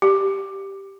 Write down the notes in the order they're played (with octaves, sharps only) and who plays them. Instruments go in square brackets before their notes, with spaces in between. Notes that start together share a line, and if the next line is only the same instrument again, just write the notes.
[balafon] G4